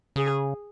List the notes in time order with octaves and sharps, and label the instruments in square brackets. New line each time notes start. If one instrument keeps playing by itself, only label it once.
[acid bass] C#3 [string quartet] G#4